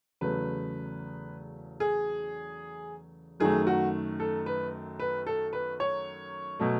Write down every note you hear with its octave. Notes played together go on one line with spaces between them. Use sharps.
E2 C#3 F#3 A3 B4
G#4
F#2 D#3 F#3 A3 G#4
F#4
A4
B4
B4
A4
B4
C#5
B2 F#3 A3